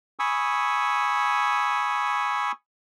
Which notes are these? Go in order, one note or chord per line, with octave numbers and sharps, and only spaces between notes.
G#5 B5 C#6 D#6 E6